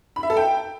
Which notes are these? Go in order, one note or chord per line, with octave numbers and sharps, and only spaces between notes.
B5
E5
A4
G5